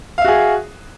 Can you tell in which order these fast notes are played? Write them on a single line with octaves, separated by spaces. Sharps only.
F5 E5 F#4 G#4